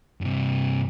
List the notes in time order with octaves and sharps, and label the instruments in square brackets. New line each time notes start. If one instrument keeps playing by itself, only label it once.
[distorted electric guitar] G2 C3